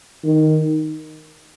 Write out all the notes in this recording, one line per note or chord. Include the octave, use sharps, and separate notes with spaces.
D#3